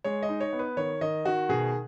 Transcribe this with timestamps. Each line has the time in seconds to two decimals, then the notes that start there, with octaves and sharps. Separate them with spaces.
0.04 G#3 C#5
0.23 D#5
0.29 D#4
0.40 C#5
0.53 B3
0.59 B4
0.77 D#3 C#5
1.01 D#3 D#5
1.25 D#3 F#4
1.49 B2 G#4